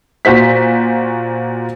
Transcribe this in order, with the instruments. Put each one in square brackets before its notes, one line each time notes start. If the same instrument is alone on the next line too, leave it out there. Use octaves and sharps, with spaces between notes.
[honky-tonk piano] A#2 F#4 C5 B6